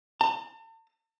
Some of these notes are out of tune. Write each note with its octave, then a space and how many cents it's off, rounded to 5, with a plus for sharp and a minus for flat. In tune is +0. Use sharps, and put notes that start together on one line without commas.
A5 +40